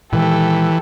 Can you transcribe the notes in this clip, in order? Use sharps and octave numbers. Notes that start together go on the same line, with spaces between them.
A#2 D#3 E3 G#3 G4 A4